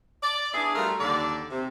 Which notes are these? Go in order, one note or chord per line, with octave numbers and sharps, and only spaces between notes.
D5
B3 D4 E4 G#4
F3 G3 A3 F4 F#4 A#4
D#2 D3 D5
C3